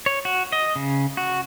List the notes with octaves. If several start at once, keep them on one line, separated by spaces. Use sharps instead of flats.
C#5
F#4
D#5
C#3
F#4